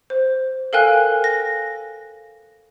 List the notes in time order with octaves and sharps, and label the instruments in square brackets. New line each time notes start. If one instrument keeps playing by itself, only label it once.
[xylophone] C5
A4 A#4 F5 G5 G#5 F#6
A#6